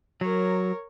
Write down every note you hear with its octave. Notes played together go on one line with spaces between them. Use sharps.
F#3 A#4 C#5